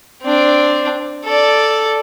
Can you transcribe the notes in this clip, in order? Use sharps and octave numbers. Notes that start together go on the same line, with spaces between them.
C4 D4
A4 D5